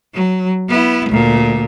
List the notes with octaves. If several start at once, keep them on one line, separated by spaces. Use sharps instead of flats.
F#3
B3 E4
D2 A#2